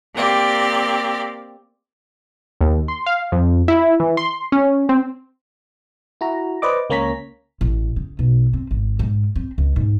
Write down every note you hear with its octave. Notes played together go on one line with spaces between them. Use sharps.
A#3 C4 G4 D5
D#2
C6
F5
F2
E4
E3
C6
C#4
C4
E4 F#4 A#5
B4 C5 D5 D#5 D6
C#2 A#3 C#4 C#5 A#5 B6
A1
C#3
B1
C4
G#1
G#2
C4
C#2
G#2